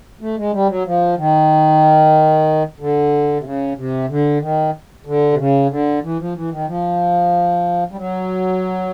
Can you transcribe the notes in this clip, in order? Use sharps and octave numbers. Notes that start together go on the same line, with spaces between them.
A3
G#3
G3
F#3
F3
D#3
D3
C3
C#3
C3
D3
D#3
D3
C3
C#3
D3
E3
F3
E3
D#3
F3
G3
F#3